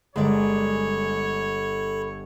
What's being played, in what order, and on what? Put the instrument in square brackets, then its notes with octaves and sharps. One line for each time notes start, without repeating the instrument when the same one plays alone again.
[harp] G1 G#5 [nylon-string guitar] G#3 A#4 D5 [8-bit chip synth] A4 B5 [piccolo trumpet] C#5